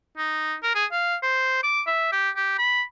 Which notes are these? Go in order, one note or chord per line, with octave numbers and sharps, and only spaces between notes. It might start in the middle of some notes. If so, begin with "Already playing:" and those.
D#4
A#4
G#4
F5
C5
D6
E5
G4
G4
B5